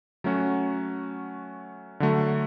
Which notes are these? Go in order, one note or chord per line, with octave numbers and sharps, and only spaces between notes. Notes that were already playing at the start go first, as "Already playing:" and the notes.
F#3 A3 C#4 F#4
D3 F#3 A3